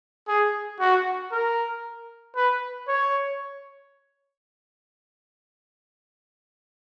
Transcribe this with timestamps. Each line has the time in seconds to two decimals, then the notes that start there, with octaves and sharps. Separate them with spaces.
0.28 G#4
0.80 F#4
1.32 A#4
2.36 B4
2.88 C#5